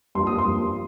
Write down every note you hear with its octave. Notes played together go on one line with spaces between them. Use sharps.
G2 F3 A#3 C6
D#6
C6
G2 F3 A#3